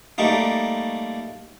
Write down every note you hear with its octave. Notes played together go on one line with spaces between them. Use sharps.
G3 A3 A#3 D#4